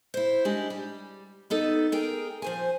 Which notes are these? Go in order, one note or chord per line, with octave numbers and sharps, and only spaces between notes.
E4 C5
G3 G#3 D4 G4
G3
B3 D#4 A4
G#4 A#4 G5
F3 C5 G#5